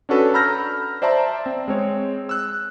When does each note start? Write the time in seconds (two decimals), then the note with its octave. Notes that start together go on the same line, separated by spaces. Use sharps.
0.09 C#4 D4 F#4 A4 B4
0.34 A#5 B5 E6 F6 G6 A#6
1.02 C5 D5 E5 A5 A#5 C6
1.46 C4
1.68 G#3 C4 C#5
2.29 E6 F#6